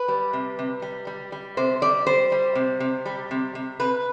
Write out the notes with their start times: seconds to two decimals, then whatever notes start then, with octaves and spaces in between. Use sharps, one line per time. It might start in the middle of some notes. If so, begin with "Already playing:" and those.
Already playing: B4
0.08 G3
0.33 C3
0.59 C3
0.82 G3
1.07 G3
1.32 G3
1.57 C3 C5
1.82 G3 D5
2.06 G3 C5
2.32 G3
2.55 C3
2.80 C3
3.06 G3
3.31 C3
3.55 C3
3.79 C3 B4